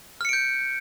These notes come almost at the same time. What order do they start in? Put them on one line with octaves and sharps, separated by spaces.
F6 C#7 D7 G6